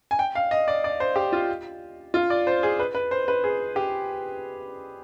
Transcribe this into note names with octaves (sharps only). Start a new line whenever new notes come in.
G#5
G5
F5
D#5
D5
D5
C5
G4
F4
F4
D5
C5
G#4
B4
B4
C5
B4
G#4
G4